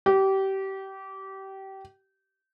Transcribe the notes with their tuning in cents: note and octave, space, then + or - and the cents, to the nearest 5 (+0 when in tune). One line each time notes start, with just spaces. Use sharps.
G4 -25